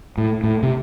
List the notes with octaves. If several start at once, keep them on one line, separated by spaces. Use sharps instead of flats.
A2
A2
C3